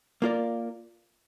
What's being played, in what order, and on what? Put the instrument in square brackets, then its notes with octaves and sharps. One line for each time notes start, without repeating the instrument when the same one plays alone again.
[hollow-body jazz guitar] A#3 F4 A#4 D5